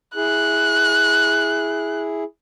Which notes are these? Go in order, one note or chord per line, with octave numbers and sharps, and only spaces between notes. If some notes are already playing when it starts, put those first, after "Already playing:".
E4 G#4 F#6